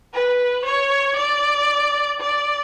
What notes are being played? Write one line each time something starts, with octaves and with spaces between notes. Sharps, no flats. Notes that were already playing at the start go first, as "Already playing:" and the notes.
B4
C#5
D5
D5